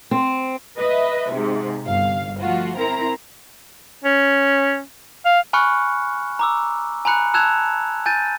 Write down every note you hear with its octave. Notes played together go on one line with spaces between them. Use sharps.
C4
B4 D#5 E5
G#2 C3
G1 F5
F3 A3 F4 F#4
C4 E4 A#4 A#5
C#4
F5
G#5 B5 C#6 F6 F#6 C#7
A#5 D6 E6
G#5 A#5 B5 F#6 C#7
A5 E6 F#6 G#6 E7 F7
G#5 G6 A6 D#7